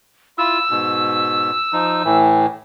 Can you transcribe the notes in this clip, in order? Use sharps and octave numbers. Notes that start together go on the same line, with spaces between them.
E4 F4 E6
G#2 B2
F3 D#4
A2 E3